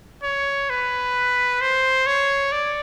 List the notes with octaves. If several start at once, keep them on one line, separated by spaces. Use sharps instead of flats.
C#5
B4
C5
C#5
D5